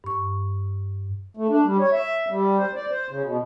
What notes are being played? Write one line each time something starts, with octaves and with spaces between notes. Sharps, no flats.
G2 C#6
A3
D4
G3
C#5
E5
G3
C5
D5
C5
C#3
B2